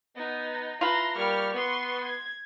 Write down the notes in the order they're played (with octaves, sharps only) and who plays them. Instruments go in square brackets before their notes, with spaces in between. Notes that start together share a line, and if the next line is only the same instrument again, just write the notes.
[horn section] B3 [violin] D#4
[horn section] E4 A5 [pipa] F4 B4 [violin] A#5 C6
[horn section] G3 A#3 [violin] C#6 F6
[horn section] B3 [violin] C6 C#6
[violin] G#6